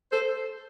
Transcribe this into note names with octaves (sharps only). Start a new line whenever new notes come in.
A4 C5